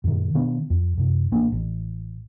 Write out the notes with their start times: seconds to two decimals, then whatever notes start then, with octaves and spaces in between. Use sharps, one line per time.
0.04 F#2 A#2 D3 D#3
0.34 B2 D#3 B3 D4
0.70 F2
0.98 F#2 C3
1.32 A1 A#3 D4
1.52 A1